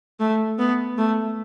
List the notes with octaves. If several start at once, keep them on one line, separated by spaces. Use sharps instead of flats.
A3
B3
A3